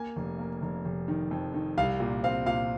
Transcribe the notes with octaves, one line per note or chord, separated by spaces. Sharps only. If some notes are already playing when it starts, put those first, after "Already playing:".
Already playing: A#3 G#5
F1
A#3
F1
F1
D#3
F2
D#3
C2 F5
A#2
C4 F5
A#2 F5